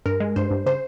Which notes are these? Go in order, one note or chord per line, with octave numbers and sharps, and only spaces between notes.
G2 A#4
G#3
G2 C5
G2
C#3 C5